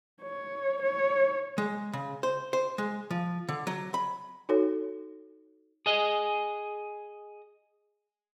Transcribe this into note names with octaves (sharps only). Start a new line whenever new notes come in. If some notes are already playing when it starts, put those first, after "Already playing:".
C#5
C#5
G#3
C#3
C5
C5
G#3
F3
D3
F#3
B5
D#4 F#4 A4 C#5
G#4 D#5